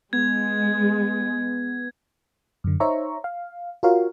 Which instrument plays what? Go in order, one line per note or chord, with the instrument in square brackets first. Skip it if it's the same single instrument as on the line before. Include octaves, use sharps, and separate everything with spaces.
[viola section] G#3 [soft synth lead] B3 [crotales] G#6
[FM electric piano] F#2 D3
D#4 C5 C#5 E5 A#5 C#6
F5
F4 F#4 A#4 C#5 F5